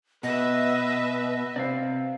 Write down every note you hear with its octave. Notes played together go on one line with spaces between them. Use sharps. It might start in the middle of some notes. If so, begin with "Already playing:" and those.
B2 B4 D#5 E5
C3 C4 D5 F5